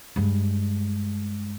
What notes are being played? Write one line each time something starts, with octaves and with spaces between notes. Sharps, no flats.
G2 G#3